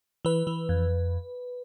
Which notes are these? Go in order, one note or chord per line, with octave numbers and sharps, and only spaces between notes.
E3 B4
E3
F2